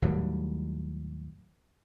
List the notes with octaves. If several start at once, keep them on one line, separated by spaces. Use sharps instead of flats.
D#2 A2 F#3 G3